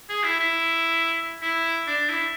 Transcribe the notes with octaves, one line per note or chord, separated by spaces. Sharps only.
G#4
E4
E4
E4
D4
E4